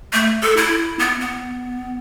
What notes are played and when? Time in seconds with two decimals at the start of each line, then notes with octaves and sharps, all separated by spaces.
0.13 A3
0.42 A4
0.57 E4
0.99 B3
1.20 B3